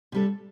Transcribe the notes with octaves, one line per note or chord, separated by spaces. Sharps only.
C3 G3 D4 A4